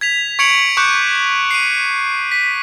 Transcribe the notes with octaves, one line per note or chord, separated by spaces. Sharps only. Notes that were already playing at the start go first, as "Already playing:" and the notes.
G#6 B6 F7
C#6 G#6 C#7 D7 F7 F#7
C#6 D6 F#6 G6 C#7
C7 D#7
B6